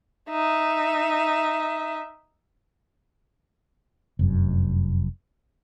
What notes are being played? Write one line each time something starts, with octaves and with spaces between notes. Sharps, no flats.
D#4 E5
F1 F#2